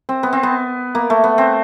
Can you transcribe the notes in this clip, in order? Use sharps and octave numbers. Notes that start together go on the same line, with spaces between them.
C4
B3
C4
B3
A#3
A3
B3
C4